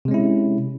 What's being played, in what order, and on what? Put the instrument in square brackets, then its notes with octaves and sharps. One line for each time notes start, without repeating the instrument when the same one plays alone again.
[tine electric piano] C3
G#3
C#4
E4